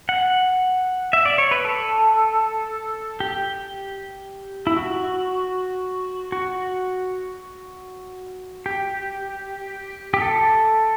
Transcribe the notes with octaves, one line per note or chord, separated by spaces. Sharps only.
F#5
E5
D5
C#5
B4
A4
G4
E4
F#4
F#4
G4
G4
A4